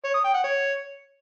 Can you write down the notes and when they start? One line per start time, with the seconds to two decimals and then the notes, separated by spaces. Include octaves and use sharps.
0.04 C#5
0.14 D#6
0.24 G5
0.34 F#5
0.44 C#5